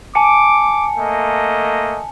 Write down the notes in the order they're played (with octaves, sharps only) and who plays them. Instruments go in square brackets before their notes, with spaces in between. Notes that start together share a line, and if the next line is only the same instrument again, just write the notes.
[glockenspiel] G#5 A5 C#7 [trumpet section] D6
[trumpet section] A3 A#3 D#5